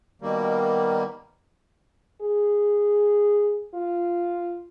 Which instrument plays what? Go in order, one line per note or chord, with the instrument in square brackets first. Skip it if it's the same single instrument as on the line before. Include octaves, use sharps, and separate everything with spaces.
[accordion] B2 D#3 G3 A#3
[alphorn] G#4
F4